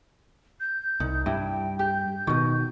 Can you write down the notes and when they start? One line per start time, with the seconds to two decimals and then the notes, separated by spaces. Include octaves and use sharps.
0.60 G6
1.00 C2 D#4
1.26 G2 E4 G5
1.79 G4 G6
2.27 B2 D#3 F#4 D#5